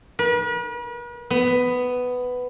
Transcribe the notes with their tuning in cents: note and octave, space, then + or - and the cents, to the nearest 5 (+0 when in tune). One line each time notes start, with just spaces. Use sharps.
B4 -45
B3 +10